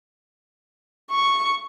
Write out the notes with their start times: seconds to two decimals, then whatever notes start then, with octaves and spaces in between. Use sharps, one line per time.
1.11 C#6